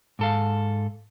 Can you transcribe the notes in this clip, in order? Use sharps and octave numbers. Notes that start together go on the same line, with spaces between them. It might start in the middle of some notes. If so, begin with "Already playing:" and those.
G#2 A4 F5